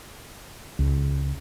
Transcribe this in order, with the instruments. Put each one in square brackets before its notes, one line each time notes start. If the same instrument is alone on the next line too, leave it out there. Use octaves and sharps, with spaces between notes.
[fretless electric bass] C#2